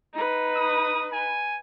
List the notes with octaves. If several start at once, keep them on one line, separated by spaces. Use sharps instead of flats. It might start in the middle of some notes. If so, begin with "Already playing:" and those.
D#4 B4
D#6
G#5